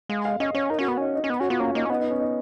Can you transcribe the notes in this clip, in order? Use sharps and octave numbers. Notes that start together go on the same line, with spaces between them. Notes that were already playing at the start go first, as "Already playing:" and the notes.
G#3 F5
F5
C#4 D#5
C#4 C#5
D#4 A#4
C#4 F#4
B3
C#4 D#4
D#4
C#4
B3
C#4 F#4
B3 F4
A#3 C#4
A#3 D#4
C#4
B3 D#4
D#4
C#4
D#4